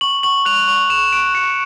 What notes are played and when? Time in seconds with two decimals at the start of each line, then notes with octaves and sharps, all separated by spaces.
0.01 C#6 F#7
0.23 C#6 F#7
0.45 F#6 F7
0.68 C#6 F7
0.90 C#6 E7
1.13 F#6 D7
1.35 C#6 C#7